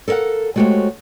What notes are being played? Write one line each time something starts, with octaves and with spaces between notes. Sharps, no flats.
A4 A#4 C#5 F5 F#5
G#3 A3 F#4 G4 C5 C#5